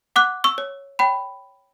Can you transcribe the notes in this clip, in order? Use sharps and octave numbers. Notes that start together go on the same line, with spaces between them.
F#5 D6 F#6
C#6 E6
C#5
C#5 G5 B5